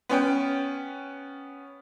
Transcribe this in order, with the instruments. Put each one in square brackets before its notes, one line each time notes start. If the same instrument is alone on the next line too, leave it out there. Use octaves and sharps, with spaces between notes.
[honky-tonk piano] B3 C#4 G5